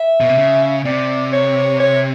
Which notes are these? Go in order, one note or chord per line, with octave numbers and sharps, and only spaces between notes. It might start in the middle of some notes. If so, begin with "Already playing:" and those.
Already playing: E5
B2
C3
C#3
C3 D5
C#5
C#5